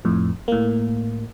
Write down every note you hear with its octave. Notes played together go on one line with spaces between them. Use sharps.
F2 A2
A2 A#3